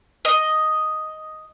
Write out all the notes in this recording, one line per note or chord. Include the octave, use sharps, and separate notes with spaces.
D#5